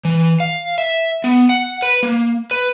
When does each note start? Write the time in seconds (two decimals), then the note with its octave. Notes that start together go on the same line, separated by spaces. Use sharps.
0.05 E3
0.40 F5
0.78 E5
1.24 B3
1.49 F#5
1.82 B4
2.03 A#3
2.51 B4